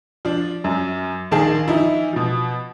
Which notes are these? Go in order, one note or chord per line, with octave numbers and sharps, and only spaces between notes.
F3 D4
F#2
A#1 D#3 G#4 A5
E3 F3 D#4 E4
B2 F3